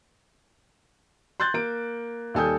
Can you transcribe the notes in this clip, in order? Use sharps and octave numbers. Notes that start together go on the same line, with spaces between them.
C6 F#6 G6 A6
A#3 D7
D#2 G3 A4 G#5 D#6 G6